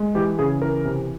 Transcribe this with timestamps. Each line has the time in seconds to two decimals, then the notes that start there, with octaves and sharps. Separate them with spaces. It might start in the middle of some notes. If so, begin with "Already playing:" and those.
Already playing: G#3
0.15 E3 G4
0.39 C#3 G#4
0.62 E3 A#4
0.85 C3